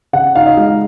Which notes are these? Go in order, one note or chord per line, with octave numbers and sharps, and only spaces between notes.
C#3 F#5
D#4 F5
D#5
G#3 F5